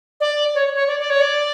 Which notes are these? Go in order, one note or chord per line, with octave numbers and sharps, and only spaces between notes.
D5
C#5
C#5
D5
D5
C#5
D5